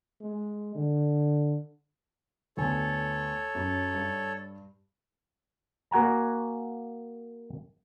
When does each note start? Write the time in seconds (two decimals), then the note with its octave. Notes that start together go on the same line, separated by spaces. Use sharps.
0.21 G#3
0.75 D3
2.57 D2 B3 A4 C#5 G#5
3.55 F#2
3.94 G2
5.91 A#3 F#4 F#5 G#5 A#5